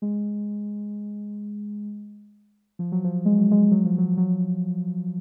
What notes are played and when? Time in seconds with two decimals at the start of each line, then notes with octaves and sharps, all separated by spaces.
0.02 G#3
2.79 F3
2.92 F#3
3.04 F3
3.25 G#3
3.38 F#3
3.51 G#3
3.71 F#3
3.85 F3
3.98 F#3
4.17 F#3